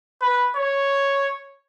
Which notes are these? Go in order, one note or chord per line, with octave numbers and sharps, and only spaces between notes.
B4
C#5